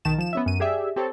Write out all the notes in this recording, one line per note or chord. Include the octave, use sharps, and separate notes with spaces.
B1 D#3 A5 E7
F3 E7
B3 C#4 E5
F#2 D#7
G4 G#4 D5 E5
C4 G4 A4 C#5